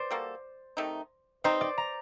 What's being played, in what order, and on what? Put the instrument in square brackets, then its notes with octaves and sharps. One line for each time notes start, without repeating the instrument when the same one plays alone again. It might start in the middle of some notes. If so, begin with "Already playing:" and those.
Already playing: [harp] C5 D5
[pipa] G3 A#3 F#4 A4
C3 D#3 A3 D#4
[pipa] G3 C4 D#4 [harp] C5
[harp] D5
A#5